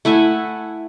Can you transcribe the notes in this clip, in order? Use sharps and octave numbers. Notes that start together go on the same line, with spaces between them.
A3 E4 F#5 G#5